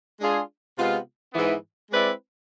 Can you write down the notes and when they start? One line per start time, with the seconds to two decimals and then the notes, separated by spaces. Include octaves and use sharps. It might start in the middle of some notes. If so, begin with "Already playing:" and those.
0.20 G#3 D4 F4 G#4
0.77 C3 G#3 B3 F4
1.34 G#2 E3 B3
1.91 G#3 C4 E4 B4 D5